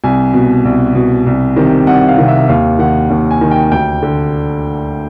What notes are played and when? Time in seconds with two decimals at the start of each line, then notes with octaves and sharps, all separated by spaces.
0.04 C2 G#5
0.33 B2
0.65 C2
0.95 B2
1.26 C2
1.56 C3 D#3
1.87 C2 F#5
2.08 F5
2.18 C3 D#3
2.28 E5
2.49 D#2 F5
2.79 D#3 F#5
3.10 D#2
3.31 G#5
3.41 D#3
3.51 G5
3.72 D2 G5
4.02 D3